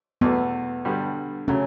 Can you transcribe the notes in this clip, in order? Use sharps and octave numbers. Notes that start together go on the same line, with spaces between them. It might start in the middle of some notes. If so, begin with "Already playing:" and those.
E2 B2 A3 B3
G2 D3 G3
C#3 F#3 A3 C#4